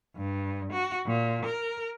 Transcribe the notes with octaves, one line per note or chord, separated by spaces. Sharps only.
G2
F#4
A#2
A#4